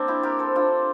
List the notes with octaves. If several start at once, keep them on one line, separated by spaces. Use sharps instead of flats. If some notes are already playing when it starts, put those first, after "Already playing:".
Already playing: A#3 C4 D4
E4 G4
G4 A#4
A4 C5
D4 F4